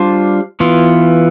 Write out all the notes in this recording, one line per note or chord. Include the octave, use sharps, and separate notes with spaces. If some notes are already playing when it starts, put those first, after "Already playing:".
Already playing: G3 D4 F4 C5
E3 B3 F4